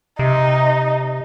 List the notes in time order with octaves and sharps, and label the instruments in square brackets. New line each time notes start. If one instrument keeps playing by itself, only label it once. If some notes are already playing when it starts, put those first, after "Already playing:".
[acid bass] C3 [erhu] D#4